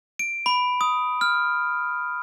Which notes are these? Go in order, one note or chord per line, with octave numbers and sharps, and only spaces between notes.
D7
B5
D#6
F6